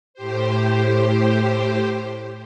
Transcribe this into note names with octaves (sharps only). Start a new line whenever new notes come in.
A2 G4 C5